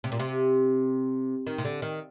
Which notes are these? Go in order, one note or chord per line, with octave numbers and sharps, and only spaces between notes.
C3
A#2
C3
D#3
C3
D3
D#3